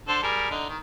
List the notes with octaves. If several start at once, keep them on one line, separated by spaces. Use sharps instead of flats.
D3 A4 C5
G3 G#4 A#4
D3 D#4
D#3